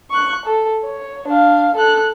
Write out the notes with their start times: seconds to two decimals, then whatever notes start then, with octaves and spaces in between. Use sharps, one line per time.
0.11 C#6 F#6
0.45 A4
0.83 C#5
1.28 D4 F5
1.76 A4 F#6